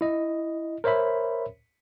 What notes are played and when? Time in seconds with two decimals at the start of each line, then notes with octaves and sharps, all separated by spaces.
0.01 E4 D#5
0.84 A#4 C5 C#5 E5 B5